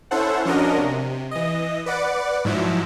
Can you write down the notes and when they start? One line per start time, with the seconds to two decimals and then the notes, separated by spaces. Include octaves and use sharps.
0.11 C#4 E4 A4 C5 F#5
0.45 F3 C#4 D4 F#4 A#4 D#5
0.77 C3
1.31 E3 D#5
1.86 B4 D5 F#5 D6
2.45 G#2 F3 F#3 E4